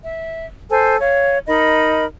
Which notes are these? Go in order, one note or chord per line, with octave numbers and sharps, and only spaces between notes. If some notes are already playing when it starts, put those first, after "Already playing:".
E5
A4 C5 G#5
C#5 F5
D#4 A#4 D#5 B5